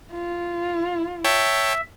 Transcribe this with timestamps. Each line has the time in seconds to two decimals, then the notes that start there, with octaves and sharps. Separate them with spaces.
0.12 F4
1.25 C#5 E5 G5 A5